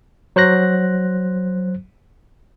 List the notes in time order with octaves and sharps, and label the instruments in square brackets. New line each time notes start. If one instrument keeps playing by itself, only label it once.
[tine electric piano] F#3 C5 F#6 A#6